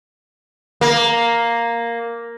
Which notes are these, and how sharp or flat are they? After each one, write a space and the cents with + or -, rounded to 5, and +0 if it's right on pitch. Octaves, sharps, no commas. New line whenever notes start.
A#3 +0